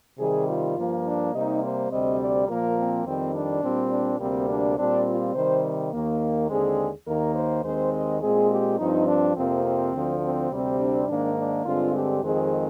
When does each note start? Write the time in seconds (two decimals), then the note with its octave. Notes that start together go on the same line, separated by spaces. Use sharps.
0.19 C3 D#3 G3 G#4
0.48 F4
0.76 G2 F3 A#3
1.04 D4
1.33 C3 G3 A#3 D#4
1.62 C5
1.91 D2 C3 G3 C4 D#5
2.19 D5
2.48 A#2 F3 A#3 A#4
2.77 C4
3.05 F2 D#3 G3 C4
3.34 D4
3.63 A#2 G3 C4
3.91 D4
4.19 D2 C3 G3 A#3 C4
4.49 D4
4.77 A#2 G3 C4 D4
5.06 F4
5.35 C3 D#3 G3 C5
5.92 D#2 D#3 A#3
6.49 D#2 D3 G#3 C4 G#4
7.06 D#2 D#3 A#3 A#4
7.36 C5
7.64 D#2 D#3 G#3 C4 C5
7.93 D#5
8.21 A#2 G#3 C4 G#4
8.50 G4
8.79 G2 F3 C4 D#4
9.07 D4
9.36 F2 C3 F3 A#3 C4
9.64 C4
9.93 D2 D3 F3
10.22 C4
10.51 D2 C3 G3 C4
10.79 D4
11.08 G#2 D#3 A#3 D4
11.37 D4
11.65 G2 D3 G#3 C4 F4
11.94 G4
12.22 F2 D#3 G#3 C4 G#4